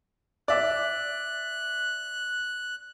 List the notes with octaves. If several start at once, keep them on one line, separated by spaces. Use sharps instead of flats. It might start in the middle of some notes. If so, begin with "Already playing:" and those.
D5 E5 F#6